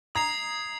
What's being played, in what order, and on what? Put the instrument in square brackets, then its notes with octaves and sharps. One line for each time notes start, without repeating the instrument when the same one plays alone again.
[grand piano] A#5 [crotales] D#6 G#6 C7 F7